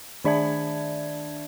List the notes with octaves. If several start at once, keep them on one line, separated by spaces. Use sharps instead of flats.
D#3 D4 D5 E5 A5 G#6